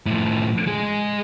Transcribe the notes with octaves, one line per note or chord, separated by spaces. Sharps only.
A2 F3
G#3 G#4